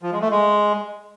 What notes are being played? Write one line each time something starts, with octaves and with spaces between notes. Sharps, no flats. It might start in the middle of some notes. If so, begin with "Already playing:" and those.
F3
G#3
A3
G#3